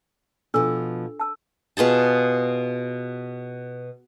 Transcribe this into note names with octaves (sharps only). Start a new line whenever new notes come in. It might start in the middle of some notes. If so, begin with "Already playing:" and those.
B2 F3 D4 A4 E6
A5 E6
B2 F4 G#4 A5